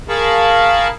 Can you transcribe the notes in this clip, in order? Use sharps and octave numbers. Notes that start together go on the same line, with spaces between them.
G#4 A#4 F5 A5 B5 C#6